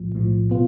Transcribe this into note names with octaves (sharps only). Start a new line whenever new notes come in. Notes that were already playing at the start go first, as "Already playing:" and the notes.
Already playing: B1 A2 F3
B1 A2 F3
B2 B3 F4